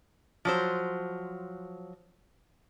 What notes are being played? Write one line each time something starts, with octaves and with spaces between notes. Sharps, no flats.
F3 F#3 C5